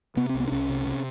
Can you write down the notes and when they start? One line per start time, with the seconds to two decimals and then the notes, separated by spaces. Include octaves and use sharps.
0.17 C3 B3
0.29 C4
0.34 C2
0.40 B3
0.48 D4
0.52 C2 C#4
0.69 C3
0.87 C3